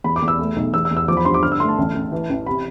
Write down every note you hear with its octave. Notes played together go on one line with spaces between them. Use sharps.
E2 B5
D6
E2
E6
A3
B1
E2 E6
E6
E2
E6
F3 D6
B5
G2 C6
D6
D3 F6
E6
A3 C6
A5
A1
A1
E3
A1
C3 B5